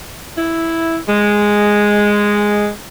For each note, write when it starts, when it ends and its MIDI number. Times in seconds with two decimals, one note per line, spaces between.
0.38 0.99 64
1.09 2.70 56